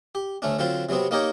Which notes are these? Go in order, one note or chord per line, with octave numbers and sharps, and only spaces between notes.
G4
D2 A3 C#4 D4
D3 F#3 C4 F4 C5
C3 F#3 G3 B3 C4
A#3 D#4 G4 A#4 C#5 G5